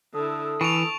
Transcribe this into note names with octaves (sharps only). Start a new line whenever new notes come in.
D3 E4 A4 D#6
E3 A5 C#6 D7 F7